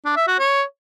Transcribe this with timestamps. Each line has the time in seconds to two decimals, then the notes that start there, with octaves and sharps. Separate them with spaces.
0.05 D4
0.17 E5
0.28 F#4
0.39 C#5